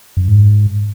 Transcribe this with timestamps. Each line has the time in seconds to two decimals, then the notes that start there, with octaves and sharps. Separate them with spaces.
0.17 F#2
0.28 G#2